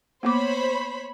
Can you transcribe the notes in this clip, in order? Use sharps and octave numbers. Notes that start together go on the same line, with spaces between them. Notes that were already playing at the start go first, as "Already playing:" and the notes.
A#3 B3 C5 C#5 B5 D6